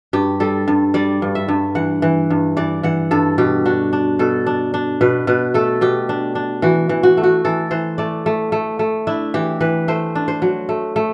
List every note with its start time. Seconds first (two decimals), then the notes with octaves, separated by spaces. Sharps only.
0.13 G2 G4
0.40 G3 A4
0.68 G2
0.94 G3 D5
1.22 G2
1.35 E5
1.48 G2
1.75 E3 F#5
2.02 E3
2.30 G2
2.57 E3 D5
2.83 E3 F#5
3.11 G2 A4
3.38 B2 G4
3.65 D4 F#4
3.93 D4
4.19 B2 A4
4.47 D4
4.74 D4
5.01 B2 B4
5.27 B2 B4
5.54 A3 A4
5.81 B2 G4
6.09 D4
6.35 D4
6.62 E3 F#4
6.89 E3
7.03 F#4
7.17 A3
7.23 F#4
7.45 E3 A4
7.71 E3 C5
7.98 A3 D5
8.26 A3
8.52 A3
8.79 A3
9.07 D4 E4
9.34 E3 G4
9.60 E3 B4
9.88 A3 C5
10.15 D4
10.28 C5
10.42 F#3
10.69 A3
10.96 A3